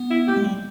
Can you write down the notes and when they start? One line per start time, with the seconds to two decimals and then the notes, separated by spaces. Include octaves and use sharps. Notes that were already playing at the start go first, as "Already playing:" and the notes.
Already playing: B3
0.11 E4
0.28 A#3 G4
0.37 G#3
0.44 G3